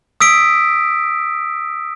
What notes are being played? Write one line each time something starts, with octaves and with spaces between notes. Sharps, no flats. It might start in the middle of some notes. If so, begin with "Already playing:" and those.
D#6 E6 B6 D7